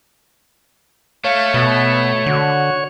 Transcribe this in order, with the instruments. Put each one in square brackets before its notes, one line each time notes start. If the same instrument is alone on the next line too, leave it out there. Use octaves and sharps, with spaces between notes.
[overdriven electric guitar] A3 [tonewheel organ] C#5 [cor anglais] F5
[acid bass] B2 [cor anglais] B3
[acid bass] D3 [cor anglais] F#4